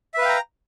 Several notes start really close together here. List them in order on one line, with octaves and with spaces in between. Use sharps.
E5 B4 F5 G5 A#5